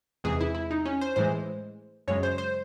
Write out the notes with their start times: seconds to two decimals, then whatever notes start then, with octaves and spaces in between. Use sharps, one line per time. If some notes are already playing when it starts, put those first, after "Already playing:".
0.24 E2 C3 E3 G#3 G#4
0.41 E4
0.55 E4
0.71 D#4
0.86 C#4
1.01 C5
1.16 A2 E3 G#3 C5
2.08 F#2 C#3 G#3 C#5
2.23 C5
2.38 C5